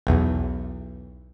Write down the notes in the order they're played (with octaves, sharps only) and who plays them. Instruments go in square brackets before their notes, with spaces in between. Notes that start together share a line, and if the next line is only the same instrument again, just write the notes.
[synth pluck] B1 E2